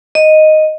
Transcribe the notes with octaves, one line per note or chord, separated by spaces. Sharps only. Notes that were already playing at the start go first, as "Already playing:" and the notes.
D#5